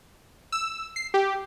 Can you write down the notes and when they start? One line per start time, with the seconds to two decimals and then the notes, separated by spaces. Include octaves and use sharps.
0.52 E6
0.96 C7
1.14 G4